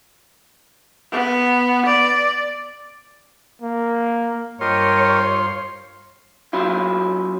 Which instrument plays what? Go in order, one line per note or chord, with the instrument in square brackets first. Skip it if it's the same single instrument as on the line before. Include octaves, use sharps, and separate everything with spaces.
[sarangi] B3
D5
[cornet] A#3
[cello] G2 C#5 [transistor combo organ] F4 C5 C6 [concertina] G4 A#4 D#5
[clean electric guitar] F#3 C#4 E4 F4